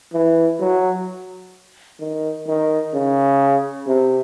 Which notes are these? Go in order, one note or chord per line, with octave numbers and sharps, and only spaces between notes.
E3
F#3
D#3
D#3
C#3
C3